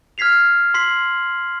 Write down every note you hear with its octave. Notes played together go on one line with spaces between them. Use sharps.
F6 G#6 B6 C7 F7
C6 B6 C7 F#7